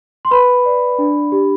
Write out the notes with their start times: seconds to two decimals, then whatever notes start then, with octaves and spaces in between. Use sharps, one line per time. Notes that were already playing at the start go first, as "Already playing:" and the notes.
0.25 C6
0.31 B4 B5
0.65 D5
0.98 D4
1.32 G4